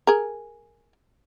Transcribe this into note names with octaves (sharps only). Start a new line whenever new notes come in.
G#4 A#4